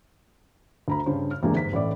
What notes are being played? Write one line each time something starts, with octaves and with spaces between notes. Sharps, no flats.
D2 A#5 B5
G2 C#3 C5
F6
E2 C3 G#3 A#3 D4
G1 G#2 B6
A1 A2 D5